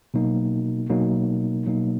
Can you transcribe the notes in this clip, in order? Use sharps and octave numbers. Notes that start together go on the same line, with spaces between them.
B2 F#3 A#3 D#4
B2 F#3 A#3 D#4
B2 F#3 A#3 D#4